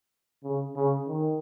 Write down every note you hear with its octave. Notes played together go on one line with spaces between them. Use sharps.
C#3
C#3
D#3